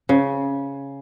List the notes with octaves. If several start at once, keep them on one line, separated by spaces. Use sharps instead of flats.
C#3